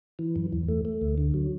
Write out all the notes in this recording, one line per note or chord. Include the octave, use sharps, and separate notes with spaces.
E3
F#2
E2
A3
A3
D2
D3
F#3